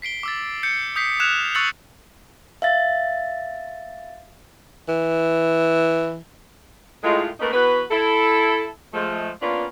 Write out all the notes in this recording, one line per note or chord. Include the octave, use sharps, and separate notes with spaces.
B6 C7 D7 G7
D6 E6 A6
G6 C#7
D#6 G6 B6 C7
D#6 F6 F#6 G#6 E7 F7
C#6 E6 F#6 A6 C#7 F#7
E5 F5 A6
E3
A2 G#3 F4
A3 A#3 C#4 D#4 A#4 B4
E3 B3 F#4 B4
E4 A4
F3 G#3 A3
A#3 B3 C#4 D4 F4